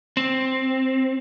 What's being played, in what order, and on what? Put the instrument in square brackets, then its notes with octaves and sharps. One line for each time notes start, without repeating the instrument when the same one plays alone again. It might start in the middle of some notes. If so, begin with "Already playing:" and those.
[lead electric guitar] C4